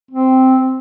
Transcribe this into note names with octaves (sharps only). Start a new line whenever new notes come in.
C4